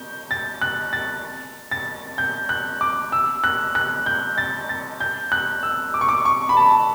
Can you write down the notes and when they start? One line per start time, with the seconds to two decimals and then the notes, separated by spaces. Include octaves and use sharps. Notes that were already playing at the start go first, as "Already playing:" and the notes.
Already playing: G6
0.31 A6
0.62 F#6
0.93 A6
1.71 A6
2.18 G6
2.49 F#6
2.81 D6
3.12 E6
3.44 F#6
3.75 F#6
4.06 G6
4.38 A6
4.69 A6
5.00 G6
5.32 F#6
5.63 E6
5.94 D6
6.01 C#6
6.09 D6
6.25 C#6
6.49 B5
6.57 A5